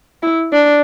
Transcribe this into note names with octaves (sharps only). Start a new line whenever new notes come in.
E4
D4